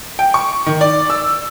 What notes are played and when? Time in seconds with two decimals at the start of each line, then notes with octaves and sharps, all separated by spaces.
0.19 G5
0.34 C#6
0.66 D#3
0.81 D5
1.10 E6